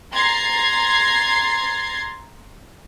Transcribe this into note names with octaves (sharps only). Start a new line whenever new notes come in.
A#5 C6 G#6 A6 C7